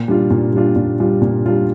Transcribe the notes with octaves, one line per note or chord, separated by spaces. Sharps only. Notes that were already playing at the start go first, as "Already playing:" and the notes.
Already playing: A#2
G3 D4 F4
A#2
G3 D4 F4
A#2
G3 D4 F4
A#2
G3 D4 F4